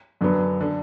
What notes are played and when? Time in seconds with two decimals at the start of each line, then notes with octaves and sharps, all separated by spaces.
0.21 F#2 D3 F#3 B3
0.61 D3